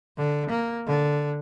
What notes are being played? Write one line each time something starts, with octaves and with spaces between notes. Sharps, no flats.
D3
A#3
D3